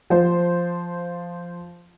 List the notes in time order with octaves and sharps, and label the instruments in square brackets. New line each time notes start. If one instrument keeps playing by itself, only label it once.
[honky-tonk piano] F3 C5